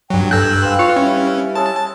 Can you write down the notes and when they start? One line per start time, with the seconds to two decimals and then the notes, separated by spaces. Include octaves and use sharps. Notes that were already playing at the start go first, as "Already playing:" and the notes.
0.10 G2 F#3 G5
0.31 G2 A4 G5 G#5 A#5 E6 F#6
0.62 C4 B4 F5
0.79 F4 C#5
0.96 G3 C#4 E4
1.55 G#3 A4 C#5 A5